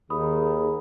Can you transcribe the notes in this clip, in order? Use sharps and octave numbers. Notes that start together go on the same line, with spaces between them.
D#2 D#3 G#4 B5 D#6